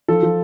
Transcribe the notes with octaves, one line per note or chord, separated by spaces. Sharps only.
F3 A4
F3